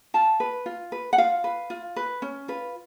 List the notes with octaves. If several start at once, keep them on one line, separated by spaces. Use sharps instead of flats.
F4 A5
B4
F4
B4
F#5
F4 F5
B4
F4
B4
C#4
F4 B4